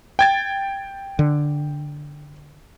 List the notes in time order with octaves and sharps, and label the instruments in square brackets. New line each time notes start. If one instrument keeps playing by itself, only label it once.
[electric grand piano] G5 G#6 A6
[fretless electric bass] D3